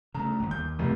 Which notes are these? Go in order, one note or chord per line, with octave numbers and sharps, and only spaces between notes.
C#3 A3 A#5
G1 D#2
D#2 G6
F1 A2 C3 A3